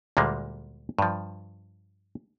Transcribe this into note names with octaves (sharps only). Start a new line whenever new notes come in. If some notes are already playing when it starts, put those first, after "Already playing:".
D2 A#2 G3 G#3 A#3
G2 F3